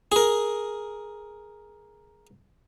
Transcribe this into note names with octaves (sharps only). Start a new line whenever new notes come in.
G#4 A#4